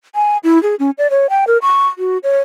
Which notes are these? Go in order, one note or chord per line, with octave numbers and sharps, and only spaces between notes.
G#5
E4
G#4
C#4
D5
C#5
G5
A#4
C#6
F#4
C#5